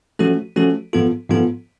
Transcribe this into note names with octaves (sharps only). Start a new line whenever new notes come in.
F3 A3 C#4 F#4 A4
F3 A3 C#4 F#4 A4
G#2 F3 B3 F4 A4
G#2 F3 B3 F4 A4